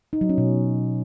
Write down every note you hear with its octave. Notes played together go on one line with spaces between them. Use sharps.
D#4
F#3
C#4
B2